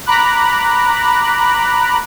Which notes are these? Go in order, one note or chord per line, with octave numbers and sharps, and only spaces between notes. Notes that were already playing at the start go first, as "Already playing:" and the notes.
A#5 B5 D6 F#6